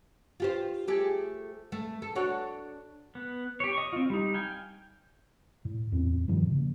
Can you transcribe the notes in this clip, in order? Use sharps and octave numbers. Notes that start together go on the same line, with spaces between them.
F4 G4 C5
A3 G4 G#4
A3
A4
D4 F#4 C#5
B3
G4 C#5
D#5 C#6
C4 F4
G3 D#4
F5 G5 G#5
A2
E2 A2 C4
G2 A#2 D#3 F3
C#3 A#3